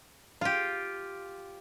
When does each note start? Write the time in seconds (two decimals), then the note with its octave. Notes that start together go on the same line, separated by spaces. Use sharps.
0.41 F4 G4